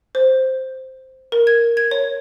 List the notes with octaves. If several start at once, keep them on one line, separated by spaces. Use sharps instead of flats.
C5
A#4
G#6
G#6
C#5